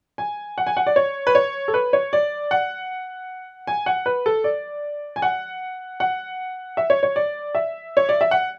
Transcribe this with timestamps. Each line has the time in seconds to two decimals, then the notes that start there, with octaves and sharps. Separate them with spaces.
0.18 G#5
0.58 F#5
0.67 G#5
0.77 F#5
0.87 D5
0.96 C#5
1.27 B4
1.35 C#5
1.68 A4
1.74 B4
1.93 C#5
2.13 D5
2.51 F#5
3.67 G#5
3.86 F#5
4.06 B4
4.26 A4
4.44 D5
5.16 G#5
5.22 F#5
6.00 F#5
6.77 E5
6.90 C#5
7.03 C#5
7.16 D5
7.55 E5
7.97 C#5
8.09 D5
8.21 E5
8.31 F#5